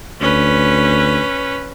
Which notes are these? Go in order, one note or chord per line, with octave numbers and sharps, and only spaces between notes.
D2 C#4 B4